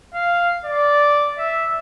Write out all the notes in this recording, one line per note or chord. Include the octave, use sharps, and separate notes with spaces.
F5
D5
E5